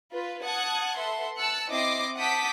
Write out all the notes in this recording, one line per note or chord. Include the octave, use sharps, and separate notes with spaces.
F4 B4
F#5 A5 D#6 F#6 G#6
A4 B4 E5 F#5 C6
A5 E6 F#6 C#7
C4 E4 D#5 D6 A#6 C7
F#5 A5 D6 D#6 G6 B6